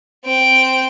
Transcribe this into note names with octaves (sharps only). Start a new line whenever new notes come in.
C4 G5